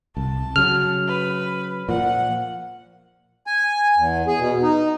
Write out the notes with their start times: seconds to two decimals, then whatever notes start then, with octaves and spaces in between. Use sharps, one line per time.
0.17 C2 A5
0.56 C#3 F#3 F6
1.07 B4
1.89 A#2 F3 F#5
3.47 G#5
3.98 E2
4.27 G#4
4.40 B2
4.62 D#4